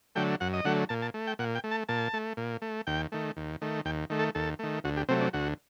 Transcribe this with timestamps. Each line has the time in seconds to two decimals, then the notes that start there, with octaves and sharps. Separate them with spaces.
0.15 D3 F#3 A3 G5
0.40 F#2 F#5
0.53 D#5
0.65 D3 F#3 A3 F#5
0.89 A#2 A5
1.02 A5
1.14 A3
1.27 G5
1.39 A#2 F#5
1.55 G5
1.64 A3
1.71 A5
1.89 A#2 A5
2.13 A3
2.37 A#2
2.62 A3
2.87 D#2 G5
3.12 D#3 A3
3.37 D#2
3.62 D#3 A3
3.85 D#2 G5
4.10 D#3 A3
4.19 A4
4.35 D#2 A4
4.59 D#3 A3
4.84 D2 F#4
4.97 G4
5.09 C3 F#3 A3 C4
5.21 D4
5.33 D2 F#4